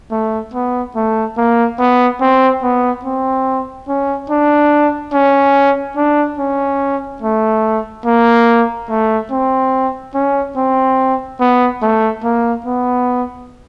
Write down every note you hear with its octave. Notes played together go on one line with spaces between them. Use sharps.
A3
B3
A3
A#3
B3
C4
B3
C4
C#4
D4
C#4
D4
C#4
A3
A#3
A3
C4
C#4
C4
B3
A3
A#3
B3